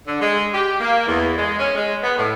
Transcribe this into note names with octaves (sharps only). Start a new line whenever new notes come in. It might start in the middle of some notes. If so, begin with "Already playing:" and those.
D3
G#3
G4
A#3
E2
G#3
C#4
G#3
B3
A2